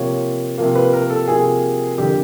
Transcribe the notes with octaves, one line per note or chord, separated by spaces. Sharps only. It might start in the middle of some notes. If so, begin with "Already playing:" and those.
Already playing: C3 F3 A#3 C#5
C3 F3 A#3
B4
A#4
A4
C3 F3 A#3 G#4
F2 D3 G3 A#3 G4